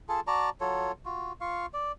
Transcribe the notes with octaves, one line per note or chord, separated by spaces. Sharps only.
F4 G#4 A4 A5
F#4 D5 A5 A#5
F#3 F4 A4 C#5
F4 F#4
F4 F5 C#6
D5